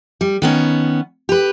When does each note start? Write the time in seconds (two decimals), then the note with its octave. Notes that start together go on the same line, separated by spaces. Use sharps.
0.21 G3
0.42 D#3 B3 C#4
1.29 G4 B4